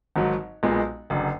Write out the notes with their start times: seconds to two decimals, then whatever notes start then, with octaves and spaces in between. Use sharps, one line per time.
0.16 G#1 G#2 F#3
0.63 B1 A#2 G#3 B3
1.10 F#1 F#2 D3